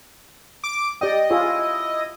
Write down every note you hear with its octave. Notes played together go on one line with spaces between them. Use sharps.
D6
G4 D5 D#5 G5
E4 F4 G#4 C#5